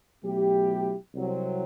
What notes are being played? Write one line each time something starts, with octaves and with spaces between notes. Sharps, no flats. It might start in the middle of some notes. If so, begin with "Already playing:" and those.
B2 F#3 A3 E4 G4
C2 C3 F#3 C4